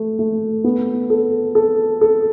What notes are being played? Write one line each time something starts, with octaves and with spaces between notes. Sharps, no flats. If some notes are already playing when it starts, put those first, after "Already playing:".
Already playing: A3
A3
B3
A4
A4
A4